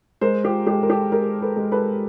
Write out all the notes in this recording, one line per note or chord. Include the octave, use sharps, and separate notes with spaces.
G#3 A#4 C5
F4 G4
G#3 G4 A4
A#4
G4 A4
G#3 G#4 A#4
A4 B4
G#3
A4 B4